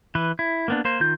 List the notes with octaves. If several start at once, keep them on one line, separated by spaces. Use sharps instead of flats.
E3 B4
E4
A#3 B3 D4
A#3 C5
D#3 F4 G6